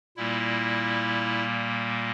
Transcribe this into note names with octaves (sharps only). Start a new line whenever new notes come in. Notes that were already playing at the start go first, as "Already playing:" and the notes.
A#2 G3 A#3 E4